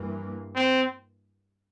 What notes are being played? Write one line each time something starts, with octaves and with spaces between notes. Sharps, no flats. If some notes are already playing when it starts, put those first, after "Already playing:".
Already playing: G2 E3 A#3
C4